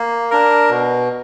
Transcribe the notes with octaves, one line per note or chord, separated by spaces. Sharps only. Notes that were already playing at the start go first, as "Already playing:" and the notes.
Already playing: A#3
D4 A#4
B2